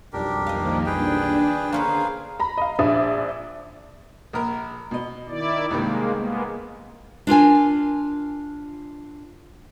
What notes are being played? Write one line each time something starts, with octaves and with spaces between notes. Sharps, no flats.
B1 F2 G3 D4 G4 A#4
D#3 F3 A#3 D#5 F5
D4 G#4 B4 G5
D3 A#3 C#4 G#4 B4 C5 F5
A#5 B5
D#5 F5
A#1 D4 D5 E5 D#6
A#1 A#4
B2 D#5
D#3 E4 D5
C2 G2 D#3 G#3 A#3
G#3 A#3 B3
D4 F4 A#4 G#5